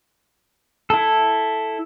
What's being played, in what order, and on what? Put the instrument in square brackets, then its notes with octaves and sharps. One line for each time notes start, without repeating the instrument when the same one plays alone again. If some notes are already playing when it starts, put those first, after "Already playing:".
[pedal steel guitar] E4 A4